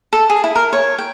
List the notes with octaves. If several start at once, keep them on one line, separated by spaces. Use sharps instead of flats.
A4
G#4
E4
A#4
C#5
G5